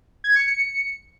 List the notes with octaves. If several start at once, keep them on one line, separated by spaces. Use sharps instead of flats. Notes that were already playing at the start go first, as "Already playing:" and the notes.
G#6
C#7
C#7